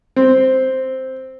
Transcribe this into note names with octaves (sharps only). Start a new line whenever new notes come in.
C4